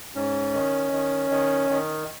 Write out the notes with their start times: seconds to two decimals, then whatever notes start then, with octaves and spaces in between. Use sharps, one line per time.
0.15 G#2 C#4
0.53 D#3
0.92 D#3
1.30 D#3
1.70 D#3